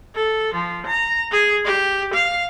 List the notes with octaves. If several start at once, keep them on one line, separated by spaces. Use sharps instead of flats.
A4
F3
A#5
G#4
G4
F5